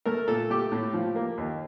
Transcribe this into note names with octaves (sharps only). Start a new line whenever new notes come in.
A3 A#4
A#2 A4
A3 G4
A2
F3
A#3
D#2